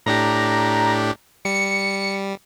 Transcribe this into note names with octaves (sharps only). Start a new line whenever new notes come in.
A2 D4 G4 A#5
G3 C#7